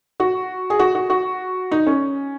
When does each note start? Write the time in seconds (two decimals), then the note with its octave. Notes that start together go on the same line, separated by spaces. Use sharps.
0.20 F#4
0.70 G#4
0.79 F#4
0.95 F#4
1.10 F#4
1.71 D#4
1.87 C#4